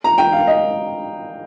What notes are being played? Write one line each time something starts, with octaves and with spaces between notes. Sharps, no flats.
A#5
G5
F5
D#5